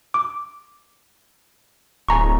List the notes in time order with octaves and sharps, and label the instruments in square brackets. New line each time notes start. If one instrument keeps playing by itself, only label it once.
[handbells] D6
[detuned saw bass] D1 [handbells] G#5 A#5 C#6